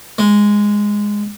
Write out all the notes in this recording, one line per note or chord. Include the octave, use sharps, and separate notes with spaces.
G#3